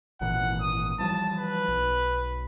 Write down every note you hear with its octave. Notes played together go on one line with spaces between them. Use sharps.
G#1 A#2 E3 F#5
D#6
E3 F3 G3 A5
B4
B1